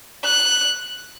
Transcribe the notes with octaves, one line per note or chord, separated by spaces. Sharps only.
F#6